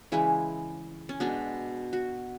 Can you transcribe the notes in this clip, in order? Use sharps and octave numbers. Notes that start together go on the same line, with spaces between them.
C#3 E3 G#3 E4
C#4
B2 G#3 B3 D4
F#4